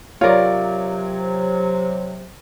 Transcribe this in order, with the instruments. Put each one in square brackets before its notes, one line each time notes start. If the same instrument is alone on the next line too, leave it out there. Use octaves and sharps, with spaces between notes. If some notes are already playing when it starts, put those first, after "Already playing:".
[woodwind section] C3 F#3 [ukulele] F4 A#4 [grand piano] C#5 D5